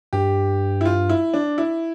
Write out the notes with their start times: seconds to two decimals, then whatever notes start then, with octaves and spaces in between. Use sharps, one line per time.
0.13 G2 G4
0.81 E4
0.85 F4
1.09 E4
1.34 D4
1.58 E4